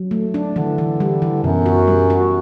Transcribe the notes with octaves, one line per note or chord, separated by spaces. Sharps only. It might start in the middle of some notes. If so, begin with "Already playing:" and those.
Already playing: F#3
A3
D4
D3 E3
E3
G3
E3
F#2 B2
F#4
G3
F#4